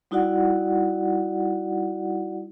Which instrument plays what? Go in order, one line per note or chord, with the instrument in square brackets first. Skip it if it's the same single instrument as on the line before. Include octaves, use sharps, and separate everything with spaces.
[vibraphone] G3 D#4 E4 F#4 D5 F#5